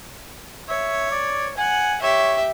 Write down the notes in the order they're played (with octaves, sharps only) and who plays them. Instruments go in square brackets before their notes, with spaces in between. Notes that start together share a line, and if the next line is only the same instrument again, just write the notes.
[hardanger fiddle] C#5 [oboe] E5
[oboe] D5
[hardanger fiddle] F#5 [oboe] G#5
[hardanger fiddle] G4 E5 [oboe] C#5